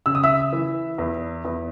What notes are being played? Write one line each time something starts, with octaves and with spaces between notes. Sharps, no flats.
C#3 E6
D#6
E5 E6
E3
E2
E2